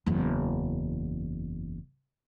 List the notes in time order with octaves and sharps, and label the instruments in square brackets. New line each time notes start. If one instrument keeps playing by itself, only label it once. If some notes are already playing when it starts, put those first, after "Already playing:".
[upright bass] F#1 E2